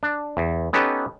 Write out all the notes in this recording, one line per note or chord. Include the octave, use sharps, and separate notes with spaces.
D4
E2
B3 C#4 D#4 G4 A4 B4